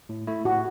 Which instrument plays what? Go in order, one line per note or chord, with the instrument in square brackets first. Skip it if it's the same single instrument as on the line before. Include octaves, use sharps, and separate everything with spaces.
[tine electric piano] A2
A3 E4
[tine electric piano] A2 [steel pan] F#4